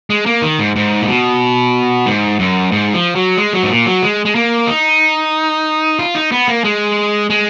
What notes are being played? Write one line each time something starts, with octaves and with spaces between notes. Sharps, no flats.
G#3
A#3
D#3
G#2
G#2
A#2
B2
G#2
F#2
G#2
F3
F#3
G#3
F#3
G#2
A#2
F#3
G#3
G#3
A#3
D#4
F4
D#4
B3
A#3
G#3
G#3